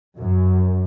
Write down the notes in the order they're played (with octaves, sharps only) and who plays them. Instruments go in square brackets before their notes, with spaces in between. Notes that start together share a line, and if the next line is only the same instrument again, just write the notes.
[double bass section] F#2